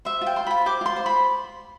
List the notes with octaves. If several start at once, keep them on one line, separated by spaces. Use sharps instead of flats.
C5 E5
F4
G5
C5 C6
F4 B5
C5 D6
F4 C6
C5
B5